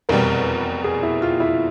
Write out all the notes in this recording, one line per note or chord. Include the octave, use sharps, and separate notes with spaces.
F1 E2 B2 G3 A#4
G#4
E4
F4
E4